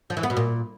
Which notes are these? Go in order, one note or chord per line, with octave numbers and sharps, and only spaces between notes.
F3
E3
B3
B2
A#2